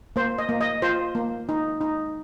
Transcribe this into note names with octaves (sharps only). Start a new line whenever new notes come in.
A#3 C5
D#5
A#3
D#5
F4 C5
A#3
D#4
D#4